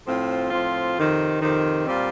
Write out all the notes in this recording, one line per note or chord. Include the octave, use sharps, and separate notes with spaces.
A2 F3 C4 F4
A2 F3 C4 F4
F2 C3 D#3
F2 C3 D#3
A#2 G3 C4 F4